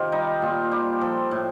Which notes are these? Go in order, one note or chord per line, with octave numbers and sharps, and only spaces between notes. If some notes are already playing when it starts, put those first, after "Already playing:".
Already playing: C3 D#3 F4 G4 A#4 C5
G3 D#4
A#2 F4
G3 G4
F3 A4
A2